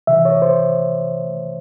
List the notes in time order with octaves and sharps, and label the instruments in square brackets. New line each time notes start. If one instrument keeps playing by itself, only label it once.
[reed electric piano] C3 E3 E5
C#5
C5